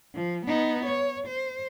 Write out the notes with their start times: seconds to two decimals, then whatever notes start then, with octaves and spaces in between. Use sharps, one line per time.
0.15 F3
0.47 B3 D#4
0.86 C#5
1.28 C5